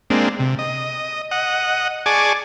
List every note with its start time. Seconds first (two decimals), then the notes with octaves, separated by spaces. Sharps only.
0.10 G#3 A#3 C4 D4
0.39 C3
0.59 D#5
1.31 D#5 F#5
2.06 G#4 D5 G#5 A5 C#6 D6